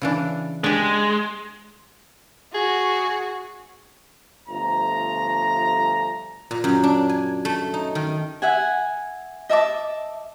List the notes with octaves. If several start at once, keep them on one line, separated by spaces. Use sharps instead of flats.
C#3 E3 D4
G#3 D4 G4
F#4 G#4
G1 F3 A3 A#5
A#2
F#2
D4
G#5
A3
D#4
D#3
E5 F#5 G#5
D#5 E5 A5 D6